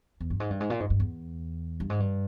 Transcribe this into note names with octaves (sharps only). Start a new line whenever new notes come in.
E2
G2
G#2
G2
G#2
A#2
G#2
G2
E2
G2
G#2
G2